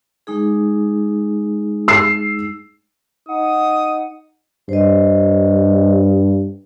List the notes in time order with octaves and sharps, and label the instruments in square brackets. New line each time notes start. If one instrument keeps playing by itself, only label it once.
[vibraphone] G#3 D#4 G#4
[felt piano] E6 C7
[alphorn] D#4 [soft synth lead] F#5 [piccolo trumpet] D#6
[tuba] G2 [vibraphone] C5 D#5